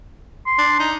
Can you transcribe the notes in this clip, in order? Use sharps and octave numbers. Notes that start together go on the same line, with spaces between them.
C6
D4
D#4